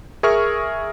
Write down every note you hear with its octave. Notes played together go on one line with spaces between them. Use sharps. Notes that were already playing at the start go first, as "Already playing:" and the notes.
G#4 A#4 E5 C#6 F6